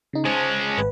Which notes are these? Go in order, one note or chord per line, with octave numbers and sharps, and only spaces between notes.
C#3 D#4
G#3 C#4 C5 A5
G#1 B4